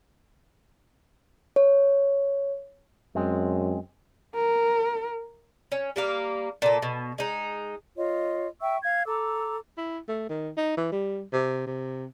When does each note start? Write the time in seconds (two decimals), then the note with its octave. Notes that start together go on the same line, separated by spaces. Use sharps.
1.56 C#5
3.15 F#2 G#3 C4
4.35 A#4
5.72 C#4
5.96 G3 A#3 F5
6.62 A#2 A4
6.82 B2
7.18 G#3 D#4
7.96 F4 C#5 D#5
8.61 E5 G5 C#6 E6
8.83 F5 G#6
9.06 A4 A#5 D6 E6
9.77 E4
10.08 A3
10.29 D#3
10.57 D#4
10.77 E3
10.92 G3
11.33 C3
11.67 C3